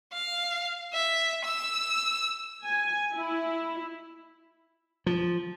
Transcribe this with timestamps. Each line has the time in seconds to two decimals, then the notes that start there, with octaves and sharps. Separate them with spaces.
0.13 F5
0.93 E5
1.45 E6
2.65 G#5
3.14 E4
5.06 F3